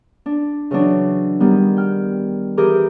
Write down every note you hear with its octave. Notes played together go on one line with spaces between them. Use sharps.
D4
C#3 E3 F#3 D4
D#3 G3 B3
G5 F6
E3 G4 G#4 A#4 D6